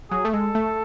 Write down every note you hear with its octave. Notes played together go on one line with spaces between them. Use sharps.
F#3 G#4
A3
G#3 A4
A3